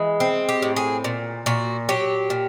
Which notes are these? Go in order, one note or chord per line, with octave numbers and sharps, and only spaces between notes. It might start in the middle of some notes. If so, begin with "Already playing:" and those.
Already playing: E3 G#3
C4
G4
A2
G#4
A#2
A#2 F#4
F#3 G4
A#2